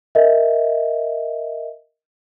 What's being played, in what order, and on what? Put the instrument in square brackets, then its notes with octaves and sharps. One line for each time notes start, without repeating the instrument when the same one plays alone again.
[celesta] A#4 D#5 E5